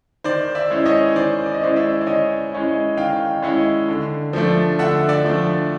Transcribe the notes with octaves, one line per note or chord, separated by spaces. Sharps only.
D#3 C5 D5
D5 E5
G#3 C#4 E4
C#5 D#5
D#3 C5 D5
D5
D#5
G#3 C#4 E4 C5 D5
D5 E5
D5
D#3 C#5 D#5
G#3 C#4 E4
D#3 F5 G5
G#3 C#4 E4
D3
F3 A3 D4
D3 E5 F#5
D5 E5
F3 A3 D4